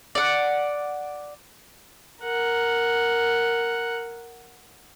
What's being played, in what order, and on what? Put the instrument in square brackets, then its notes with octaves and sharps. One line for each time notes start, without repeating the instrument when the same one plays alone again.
[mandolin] D5 F#5
[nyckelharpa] A#4 F#5